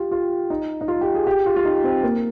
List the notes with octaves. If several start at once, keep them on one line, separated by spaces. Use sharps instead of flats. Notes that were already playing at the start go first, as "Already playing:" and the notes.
Already playing: F4 G4
F4
D#4
D#4
F4
G4
G#4
G4
F4
F4
D#4
C4
A#3